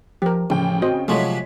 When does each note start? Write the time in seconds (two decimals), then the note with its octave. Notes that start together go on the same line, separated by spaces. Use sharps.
0.22 F3 G4 A#4
0.50 A1 C#3 F3 G5
0.82 C4 F#4 C5 D#5
1.08 C3 F3 F#3 G#3 A3 C#5 D#5 B6